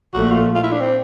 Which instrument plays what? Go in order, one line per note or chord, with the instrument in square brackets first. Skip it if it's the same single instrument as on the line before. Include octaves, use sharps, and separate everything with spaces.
[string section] A#1 A#2 F3 A3 [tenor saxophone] F#4
[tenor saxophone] F4
F4
E4
D4
C4